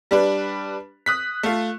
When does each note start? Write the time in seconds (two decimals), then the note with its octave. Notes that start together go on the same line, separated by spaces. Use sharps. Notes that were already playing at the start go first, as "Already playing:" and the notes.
0.11 G3 D4 B4
1.06 D#6 F#6 B6
1.43 A3 F4